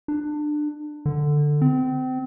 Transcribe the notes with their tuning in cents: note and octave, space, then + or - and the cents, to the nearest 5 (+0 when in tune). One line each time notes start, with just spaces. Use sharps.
D4 +25
D3 +10
C4 -30